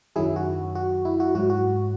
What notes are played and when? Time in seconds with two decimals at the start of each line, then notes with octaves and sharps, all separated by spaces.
0.16 F#2 D#3 F#3 E4 G#4
0.36 F#4
0.75 F#4
1.05 E4
1.20 F#4
1.35 G#2 F#3 F#4
1.50 F#4